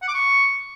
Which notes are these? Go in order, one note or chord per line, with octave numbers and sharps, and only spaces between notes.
F#5
D6
C#6